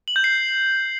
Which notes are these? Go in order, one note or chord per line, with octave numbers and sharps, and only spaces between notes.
F#7
G6
C7